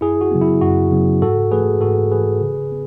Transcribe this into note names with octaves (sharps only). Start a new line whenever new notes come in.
F#2 E4 G#4
F#4
C#3 F#3 B3
E4
F#2 F#4
C#3 F#3 B3
G#2 F#4 A4
E3 A3 G#4 B4
G#2 F#4 A4
E3 A3 G#4 B4
C#3
B3